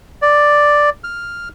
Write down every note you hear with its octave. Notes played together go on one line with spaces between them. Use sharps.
D5
F6